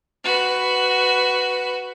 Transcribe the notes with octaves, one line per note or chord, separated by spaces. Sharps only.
F#4 B4